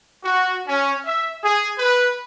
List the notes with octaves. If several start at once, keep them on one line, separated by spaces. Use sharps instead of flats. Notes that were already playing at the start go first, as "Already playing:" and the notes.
F#4
C#4
E5
G#4
B4